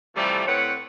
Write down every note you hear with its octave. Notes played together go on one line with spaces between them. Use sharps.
C3 E3 F3 G3 A3
A2 C4 B4 C#5 F#5 G5